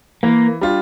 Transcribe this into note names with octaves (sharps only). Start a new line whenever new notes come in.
E3 A#3
G3 D4 F4